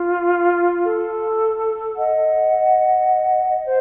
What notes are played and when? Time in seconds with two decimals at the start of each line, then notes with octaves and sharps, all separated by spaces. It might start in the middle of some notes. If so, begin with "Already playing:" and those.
Already playing: F4
0.84 A4
1.96 D#5 F#5
3.65 C5